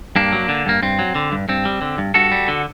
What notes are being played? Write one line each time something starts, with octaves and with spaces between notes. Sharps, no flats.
G2 A#3 D4
F#3
D3
G2 A#3
G2 C4
F#3
D3
G2
G2 C4
G3
D3
G2
G2 F#4 A4
G3
D3